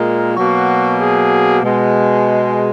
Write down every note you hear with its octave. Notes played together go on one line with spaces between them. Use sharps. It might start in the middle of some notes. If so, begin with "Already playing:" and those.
Already playing: A#2 G#3 A#4
B2 F#3 A#3 F#4
G#4
B2 G#3